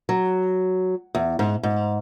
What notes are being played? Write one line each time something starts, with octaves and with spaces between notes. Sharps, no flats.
F#3
E2
G#2
G#2